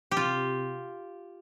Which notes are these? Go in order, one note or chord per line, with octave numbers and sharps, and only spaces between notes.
G4
C3 F4